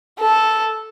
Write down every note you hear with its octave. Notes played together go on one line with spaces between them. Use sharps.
A4